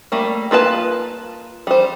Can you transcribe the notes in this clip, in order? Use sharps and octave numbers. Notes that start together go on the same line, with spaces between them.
G3 A3 A#3
A#3 F4 B4 A5
G3 C5